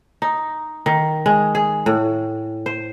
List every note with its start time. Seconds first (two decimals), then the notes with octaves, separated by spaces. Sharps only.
0.22 D#4
0.86 D#3
1.26 G#3
1.55 G#4
1.86 A2
2.66 C5